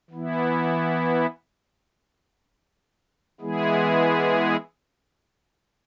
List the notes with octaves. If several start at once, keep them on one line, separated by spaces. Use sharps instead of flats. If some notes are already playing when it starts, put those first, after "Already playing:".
E3 B3 E4
E3 G#3 B3 E4 G#4